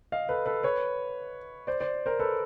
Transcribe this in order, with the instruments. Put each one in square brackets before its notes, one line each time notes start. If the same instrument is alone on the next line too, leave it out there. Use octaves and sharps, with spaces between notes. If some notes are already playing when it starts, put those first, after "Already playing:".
[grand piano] D#5 F5
A4 B4
A4 B4
B4 C#5
C5 D5
C5 D5
A#4 C5
A4 B4